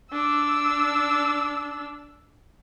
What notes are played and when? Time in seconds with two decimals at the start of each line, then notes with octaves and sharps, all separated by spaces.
0.12 D4 E6